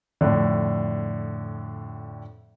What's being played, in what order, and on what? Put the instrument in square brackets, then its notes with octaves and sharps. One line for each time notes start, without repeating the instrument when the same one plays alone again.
[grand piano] F2 A2 D3